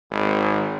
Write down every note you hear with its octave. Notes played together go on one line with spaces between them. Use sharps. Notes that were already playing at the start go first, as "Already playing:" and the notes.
G#1